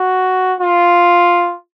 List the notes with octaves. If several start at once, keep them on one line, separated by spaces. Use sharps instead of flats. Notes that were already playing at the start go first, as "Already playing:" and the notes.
Already playing: F#4
F4